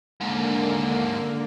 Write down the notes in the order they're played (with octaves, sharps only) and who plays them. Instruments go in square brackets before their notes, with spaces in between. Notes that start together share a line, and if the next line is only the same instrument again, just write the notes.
[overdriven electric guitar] D#2 G#2 [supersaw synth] D3 A#3